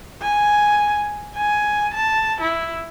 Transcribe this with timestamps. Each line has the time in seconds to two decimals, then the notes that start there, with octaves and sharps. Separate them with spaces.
0.22 G#5
1.36 G#5
1.94 A5
2.41 E4